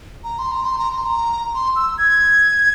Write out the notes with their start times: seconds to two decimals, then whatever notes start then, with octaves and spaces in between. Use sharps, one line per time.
0.24 A#5
0.39 C6
0.51 A#5
0.65 C6
0.78 A#5
0.92 C6
1.06 A#5
1.55 C6
1.76 E6
1.98 G#6